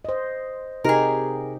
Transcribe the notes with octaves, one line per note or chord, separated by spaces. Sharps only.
C5 D#5
C3 D#4 G4 G#4 A#4